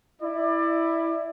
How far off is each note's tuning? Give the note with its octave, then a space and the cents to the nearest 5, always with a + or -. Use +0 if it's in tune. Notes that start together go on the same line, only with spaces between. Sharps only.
E4 +0 D5 +25